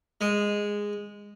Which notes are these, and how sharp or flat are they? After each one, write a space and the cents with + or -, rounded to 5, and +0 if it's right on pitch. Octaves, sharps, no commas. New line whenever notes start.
G#3 -10